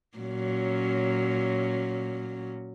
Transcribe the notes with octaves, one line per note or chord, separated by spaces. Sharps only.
A#2 F#3 C#4